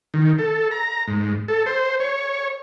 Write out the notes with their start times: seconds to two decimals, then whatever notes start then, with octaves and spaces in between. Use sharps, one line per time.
0.14 D#3
0.38 A4
0.71 A#5
1.08 G#2
1.48 A4
1.66 C5
2.00 C#5